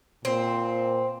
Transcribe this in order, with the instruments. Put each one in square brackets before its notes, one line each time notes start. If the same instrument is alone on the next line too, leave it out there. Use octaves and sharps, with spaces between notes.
[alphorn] A#2 [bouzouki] C4